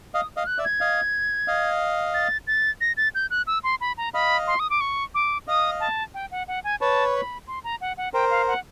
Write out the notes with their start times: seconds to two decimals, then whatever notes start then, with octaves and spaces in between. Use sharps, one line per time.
0.14 D#5 F5 D#6
0.37 D#5 F5
0.43 F6
0.47 F#6
0.58 D5 E5
0.65 G#6
0.81 D#5 F5
1.48 D#5 F5
2.14 A6
2.47 A6
2.81 A#6
2.97 A6
3.15 G6
3.30 F#6
3.47 E6
3.64 C6
3.81 B5
3.98 A#5
4.14 D#5 F5 B5
4.47 C6
4.60 D#6
4.70 D6
4.81 C#6
5.15 D6
5.47 D#5 F5 D#6
5.80 A5
6.14 G5
6.31 F#5
6.48 F#5
6.64 G#5
6.80 B4 C#5 A5
7.15 B5
7.47 C6
7.64 A#5
7.81 F#5
7.97 F#5
8.14 A#4 C5 G5
8.30 F5
8.48 F#5